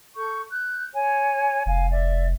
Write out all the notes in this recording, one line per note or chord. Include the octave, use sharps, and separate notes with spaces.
A4 C#6 G6
F#6 G6
C#5 G#5
F1 F5 G#5
D5 E5